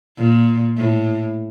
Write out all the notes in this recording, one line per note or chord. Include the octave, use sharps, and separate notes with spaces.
A#2
A2